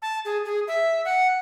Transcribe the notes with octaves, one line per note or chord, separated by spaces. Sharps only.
A5
G#4
G#4
E5
F#5